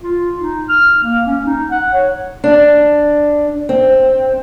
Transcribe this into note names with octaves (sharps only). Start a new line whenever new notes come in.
F4
D#4
F6
A#3
C#4
D#4
F#5
C#5
D4
C4